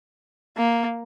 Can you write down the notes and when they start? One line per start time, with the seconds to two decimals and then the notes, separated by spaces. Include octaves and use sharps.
0.57 A#3